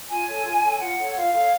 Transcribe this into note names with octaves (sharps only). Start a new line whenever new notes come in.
F4 G#5
A4 C#5
F4
A4 C#5
F4 F#5
A4 C#5
F4 F5
A4
C#5